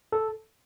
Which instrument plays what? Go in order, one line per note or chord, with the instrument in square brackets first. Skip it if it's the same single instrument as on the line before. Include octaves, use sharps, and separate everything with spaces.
[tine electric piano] A4